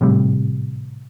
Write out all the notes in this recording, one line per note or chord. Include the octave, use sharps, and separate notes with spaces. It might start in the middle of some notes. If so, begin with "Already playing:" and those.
G#1 A2 C3 G3